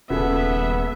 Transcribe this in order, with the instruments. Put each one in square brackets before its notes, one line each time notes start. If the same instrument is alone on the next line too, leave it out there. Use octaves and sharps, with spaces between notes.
[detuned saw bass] D#1 [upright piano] C#3 G#4 A4 [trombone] B3 [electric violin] E5